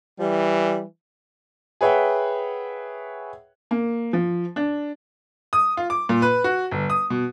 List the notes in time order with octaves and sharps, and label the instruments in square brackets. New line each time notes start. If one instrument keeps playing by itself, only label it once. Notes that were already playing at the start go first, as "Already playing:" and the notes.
[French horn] E3 [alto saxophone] G3
[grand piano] G#4 B4 C#5 E5 F#5 G5
[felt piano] A#3
F3
D4
[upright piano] D#6
F4
D6
A#2
B4
F#4
G1
D#6
B2